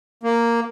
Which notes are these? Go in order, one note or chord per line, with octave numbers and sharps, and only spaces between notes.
A#3